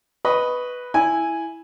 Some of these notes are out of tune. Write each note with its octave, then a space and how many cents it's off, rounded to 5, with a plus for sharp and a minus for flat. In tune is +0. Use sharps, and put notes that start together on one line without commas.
B4 +0 D#5 +5 C#6 +0
E4 +0 G#5 +0